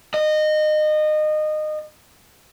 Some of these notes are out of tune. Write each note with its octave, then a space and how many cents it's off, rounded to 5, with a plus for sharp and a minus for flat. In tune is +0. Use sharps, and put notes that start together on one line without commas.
D#5 -25